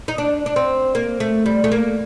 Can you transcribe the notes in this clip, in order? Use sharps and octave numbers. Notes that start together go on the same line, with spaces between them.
D#4
D4
D4
C4
A#3
A3
G3
A3
A#3